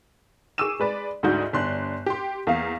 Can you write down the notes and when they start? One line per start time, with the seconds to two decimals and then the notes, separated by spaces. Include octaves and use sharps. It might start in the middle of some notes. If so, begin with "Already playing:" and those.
0.58 G#4 C#6 D6 E6 D#7 E7
0.80 G#3 B4 D5
1.23 D2 G#2 D4 D#4 F#4 G6
1.53 G1 D4 C6 F#6
2.06 G4 C6
2.47 E2 A#3 F5